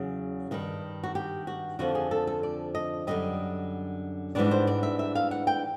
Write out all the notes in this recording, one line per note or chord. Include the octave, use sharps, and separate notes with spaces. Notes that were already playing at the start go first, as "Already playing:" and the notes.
Already playing: E2 C#3 F#3
G2 D#3 G3
F#4
G4
F#4
F2 D3 F3 F#4
G#4
A4
A4
D5
D#5
F#2 D3 G3 D#5
G#2 E3 G3 B3 D4 D5
C5
D5
E5
E5
F5
F#5
G5